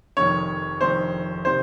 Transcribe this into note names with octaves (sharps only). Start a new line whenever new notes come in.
F1 F2 D#3 C#5
F1 F2 D#3 C5
C3 D#3 C5